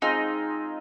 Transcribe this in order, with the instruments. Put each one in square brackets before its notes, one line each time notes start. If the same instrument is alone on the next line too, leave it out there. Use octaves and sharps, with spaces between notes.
[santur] G#3 C4 F4 G#4 [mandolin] D#4